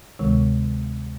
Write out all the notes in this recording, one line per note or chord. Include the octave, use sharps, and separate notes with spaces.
D2 C3 D#3 G#3